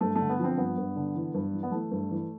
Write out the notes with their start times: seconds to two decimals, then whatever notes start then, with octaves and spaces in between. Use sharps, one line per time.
0.01 G2 A3
0.15 D3 A3
0.29 B3
0.39 F3 C4
0.57 G2 B3
0.77 G2
0.96 D3
1.15 E3
1.34 G2
1.53 E3
1.63 B3
1.72 E3 A3
1.91 G2
2.11 E3